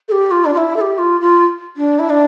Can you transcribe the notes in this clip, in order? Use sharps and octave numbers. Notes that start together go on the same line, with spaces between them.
A4
G4
F4
D4
F4
E4
A4
G4
F4
F4
D4
E4
D4